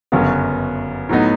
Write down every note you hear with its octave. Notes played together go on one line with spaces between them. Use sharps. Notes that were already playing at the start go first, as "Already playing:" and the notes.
G1 F#2 C#3 F#3 B3
A2 F#3 B3 D#4